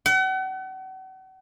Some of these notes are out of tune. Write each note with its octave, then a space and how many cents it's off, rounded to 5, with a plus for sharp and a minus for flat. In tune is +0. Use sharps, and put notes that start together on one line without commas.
F#5 +40